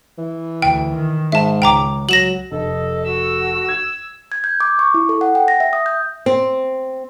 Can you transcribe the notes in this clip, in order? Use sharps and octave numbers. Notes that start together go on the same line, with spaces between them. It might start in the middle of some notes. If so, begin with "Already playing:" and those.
E3
D2 G5
D#3
G#2 E5 A5
C#2 G5 A#5 D6
F#3 A#6 E7 F#7
F1 A4 D#5
F#4 E6
G#6
G#6
G6
D6
C#6
E4
A4
F#5
G5
A#6
E5
D#6
G6
C4